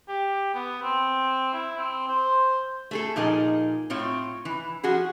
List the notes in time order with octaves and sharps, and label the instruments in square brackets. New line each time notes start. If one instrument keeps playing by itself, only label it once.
[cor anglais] G4
B3
C4
E4
C4
C5
[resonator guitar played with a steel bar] A3 G#4 A4
A#2 F3 D#4 G#4 A#4
A2 C4 F4 C#5
E3
F3 F#4 G#4